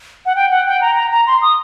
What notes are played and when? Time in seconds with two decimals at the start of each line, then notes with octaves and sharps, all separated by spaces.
0.26 F#5
0.36 G5
0.51 F#5
0.67 G5
0.81 A#5
0.96 A#5
1.11 A#5
1.27 C6
1.42 D#6